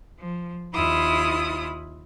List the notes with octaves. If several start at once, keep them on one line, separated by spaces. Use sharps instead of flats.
F3
D#2 E4 F4 B5 D#6